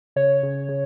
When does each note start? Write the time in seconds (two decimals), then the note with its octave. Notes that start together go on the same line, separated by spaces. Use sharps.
0.16 C#3 C#5
0.43 C#3
0.69 C#3